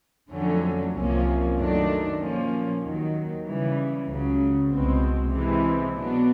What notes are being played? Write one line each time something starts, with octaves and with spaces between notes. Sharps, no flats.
F2 D3 F#3 A3 C#4
C2 C3 F3 A#3 C#4
F#2 D#3 F#3 A3 D4
A#2 F3 A#3 C#4
D#2 D#3 F#3
C#3 E3 G3
C#2 C#3 F#3
C2 B2 G#3 C4
C3 E3 G#3 C4
B2 F#3 B3 D4